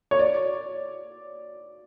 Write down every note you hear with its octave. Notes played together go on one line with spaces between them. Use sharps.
C#5
D5